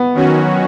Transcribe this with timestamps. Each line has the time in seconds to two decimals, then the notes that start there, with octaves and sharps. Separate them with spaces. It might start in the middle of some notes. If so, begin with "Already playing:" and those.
Already playing: B3
0.14 D#3 F#3 C#4 F#4